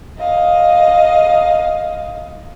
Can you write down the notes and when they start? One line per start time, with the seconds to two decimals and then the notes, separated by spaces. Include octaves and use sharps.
0.18 D#5 F5